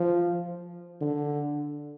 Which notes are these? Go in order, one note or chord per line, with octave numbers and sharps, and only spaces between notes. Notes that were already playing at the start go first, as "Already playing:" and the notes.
Already playing: F3
D3